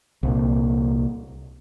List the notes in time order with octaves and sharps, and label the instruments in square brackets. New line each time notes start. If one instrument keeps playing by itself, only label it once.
[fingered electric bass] C2 A#2